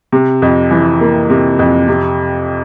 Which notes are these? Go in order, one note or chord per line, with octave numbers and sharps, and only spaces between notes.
C3
F2
E3
A#3
C3
F2
C3